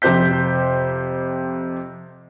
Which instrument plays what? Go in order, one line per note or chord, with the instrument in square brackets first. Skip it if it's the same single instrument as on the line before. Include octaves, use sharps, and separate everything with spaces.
[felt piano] F2 C3 G4 C5 G6 B6